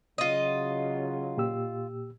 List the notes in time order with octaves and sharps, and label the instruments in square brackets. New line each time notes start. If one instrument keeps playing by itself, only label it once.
[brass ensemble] C#3 F#3 [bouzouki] F4 D#5
[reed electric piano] A#2 G4 E6